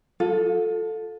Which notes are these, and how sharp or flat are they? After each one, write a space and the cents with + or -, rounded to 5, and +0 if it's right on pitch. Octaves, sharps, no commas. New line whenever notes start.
F4 +35 A4 +0